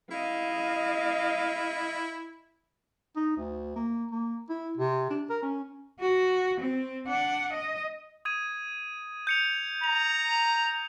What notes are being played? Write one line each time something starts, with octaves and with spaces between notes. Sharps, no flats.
E4 D#5 F5
D#4
D2
A#3
A#3
E4
C3
D4
A#4
C#4
F#4
C4
D4 F#5
D#5
D#6 G#6 D#7
G6 C#7 F7
A#5 F7